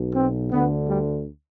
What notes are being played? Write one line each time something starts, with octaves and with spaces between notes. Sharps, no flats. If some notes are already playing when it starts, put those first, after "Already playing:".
Already playing: B1 B2
C4
D2 D3 B3
G3